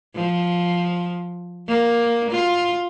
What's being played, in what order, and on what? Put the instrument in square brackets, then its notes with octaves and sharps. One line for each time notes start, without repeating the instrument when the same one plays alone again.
[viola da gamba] F3
A#3
F4